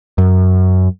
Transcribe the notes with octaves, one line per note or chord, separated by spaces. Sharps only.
F#2